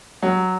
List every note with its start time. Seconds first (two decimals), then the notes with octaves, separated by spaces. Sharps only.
0.23 F#3